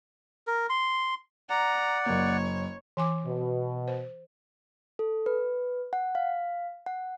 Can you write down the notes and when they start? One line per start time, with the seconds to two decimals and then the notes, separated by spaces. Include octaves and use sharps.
0.47 A#4
0.69 C6
1.49 D5 F#5 A#5
2.06 F#1 A#3 C#5
2.97 E3 G#5 D6
3.25 B2
3.88 C5
4.99 A4
5.26 B4
5.93 F#5
6.15 F5
6.86 F#5